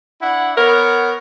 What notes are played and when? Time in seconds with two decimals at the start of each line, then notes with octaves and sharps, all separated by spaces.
0.22 D4 E4 F#5
0.57 B3 A#4 C#5 F#5